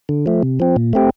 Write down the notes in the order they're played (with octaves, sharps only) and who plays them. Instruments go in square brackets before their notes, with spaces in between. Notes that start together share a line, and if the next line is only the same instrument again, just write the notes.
[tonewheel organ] D3
F3 A3
C3
F3 C4
A#2
A3 C4 G4